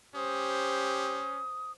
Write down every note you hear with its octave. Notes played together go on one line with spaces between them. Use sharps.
C#4 G4 C5 D#6